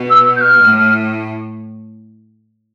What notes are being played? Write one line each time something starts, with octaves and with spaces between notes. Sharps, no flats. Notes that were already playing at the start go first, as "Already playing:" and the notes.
Already playing: B2
E6
G6
F6
A2